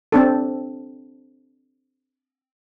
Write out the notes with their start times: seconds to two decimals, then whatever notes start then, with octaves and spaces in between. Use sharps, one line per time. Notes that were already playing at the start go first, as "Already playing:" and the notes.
0.12 C4 D4 A4